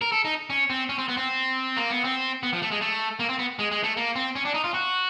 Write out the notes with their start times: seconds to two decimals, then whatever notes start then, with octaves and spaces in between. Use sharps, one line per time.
0.01 A#4
0.12 A4
0.25 D#4
0.50 C#4
0.70 C4
0.89 C#4
0.98 C4
1.08 B3
1.17 C4
1.77 A#3
1.90 B3
2.04 C4
2.43 B3
2.53 F3
2.62 A3
2.71 G#3
2.81 A3
3.19 A#3
3.29 C4
3.39 B3
3.59 G#3
3.71 G#3
3.83 A3
3.97 A#3
4.15 C4
4.35 C#4
4.45 D4
4.54 D#4
4.64 F4
4.74 F#4